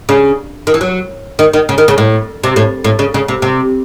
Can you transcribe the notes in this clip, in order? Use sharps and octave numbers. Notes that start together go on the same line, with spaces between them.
C#3
D#3
E3
F#3
D#3
D#3
C#3
D#3
C#3
A2
C3
A2
A2
C#3
C#3
C3
C3